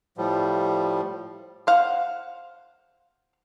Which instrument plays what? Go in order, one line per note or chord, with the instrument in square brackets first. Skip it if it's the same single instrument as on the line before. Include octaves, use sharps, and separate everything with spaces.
[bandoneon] A2 F3 G3
[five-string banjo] C5 F5 F#5